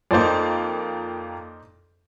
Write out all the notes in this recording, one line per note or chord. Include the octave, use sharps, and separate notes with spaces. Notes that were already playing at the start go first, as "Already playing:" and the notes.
F2 A#3 D#4 C5 D5